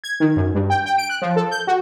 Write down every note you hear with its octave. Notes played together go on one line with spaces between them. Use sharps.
G#6
D#3
F#2
G2
G5
G5
D7
F#6
F3
A4
G6
F#4